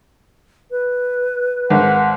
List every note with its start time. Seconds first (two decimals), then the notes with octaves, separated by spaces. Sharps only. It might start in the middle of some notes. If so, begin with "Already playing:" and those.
0.71 B4
1.70 G#1 F#5